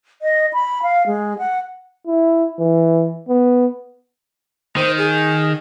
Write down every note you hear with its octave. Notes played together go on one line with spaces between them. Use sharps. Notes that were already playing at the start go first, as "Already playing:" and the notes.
D#5
B5
F5
G#3
F#5
E4
E3
B3
D#3 C5
G#4